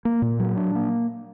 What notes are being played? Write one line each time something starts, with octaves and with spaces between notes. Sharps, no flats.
A#3
A#2
F#3
D4
A#3